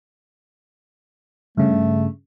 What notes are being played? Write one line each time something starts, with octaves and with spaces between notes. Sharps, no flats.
G2 C#3 A3